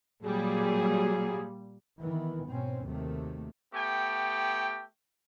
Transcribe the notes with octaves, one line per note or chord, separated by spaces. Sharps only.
A#2 F#3 G3 G#4
D#3 E3 B3
G#2 B2 C4 C#4
D#2 C3 D#3 F#3 A3
A3 B3 G4 G5